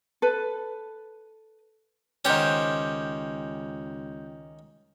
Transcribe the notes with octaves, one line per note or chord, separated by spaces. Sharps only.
A4 B4
C#2 D#3 C#4 G4 C5 F#5